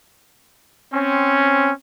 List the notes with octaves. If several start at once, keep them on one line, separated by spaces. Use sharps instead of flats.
C4 C#4